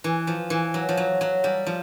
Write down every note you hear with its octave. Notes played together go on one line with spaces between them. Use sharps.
E3
F3
E3
F#3
F3
F#3
F#3
G3
F3